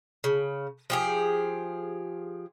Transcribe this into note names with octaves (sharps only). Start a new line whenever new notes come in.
C#3
F3 G4 G#4